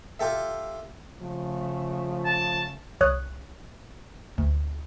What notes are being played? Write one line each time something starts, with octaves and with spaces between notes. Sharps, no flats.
F4 G4 A4 E5
C#3 F3 A3
A5
C2 C#5 D#6 F#6
D2